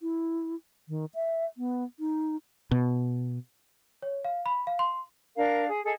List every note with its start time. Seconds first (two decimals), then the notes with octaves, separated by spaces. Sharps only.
0.01 E4
0.89 D#3
1.15 E5
1.57 B3
2.00 D#4
2.71 B2
4.02 C#5
4.25 F5
4.46 B5
4.67 F5
4.79 C6
5.37 D4 A#4 F5
5.70 G#4
5.84 G#4 A4 D#5